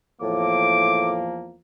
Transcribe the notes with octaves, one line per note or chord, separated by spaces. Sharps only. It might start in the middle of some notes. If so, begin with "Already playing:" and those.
E2 A2 F3 A#3 D6